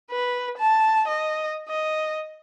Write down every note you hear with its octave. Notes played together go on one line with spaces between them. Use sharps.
B4
A5
D#5
D#5